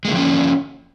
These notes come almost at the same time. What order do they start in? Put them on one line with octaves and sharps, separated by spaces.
G#3 A#3 D3 F3 C#4